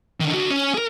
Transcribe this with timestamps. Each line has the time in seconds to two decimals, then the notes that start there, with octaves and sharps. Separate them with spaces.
0.20 D3 D#3
0.33 D3 F#4
0.50 C#4 C#5
0.74 G#4 A#4